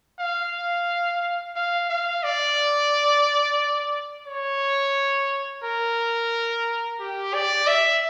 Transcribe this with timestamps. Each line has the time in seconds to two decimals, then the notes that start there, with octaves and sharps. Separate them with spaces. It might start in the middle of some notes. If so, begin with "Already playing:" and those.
0.19 F5
1.56 F5
1.90 F5
2.23 D5
4.27 C#5
5.63 A#4
7.00 G4
7.34 D5
7.67 E5